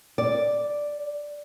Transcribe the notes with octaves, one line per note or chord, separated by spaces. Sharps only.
D5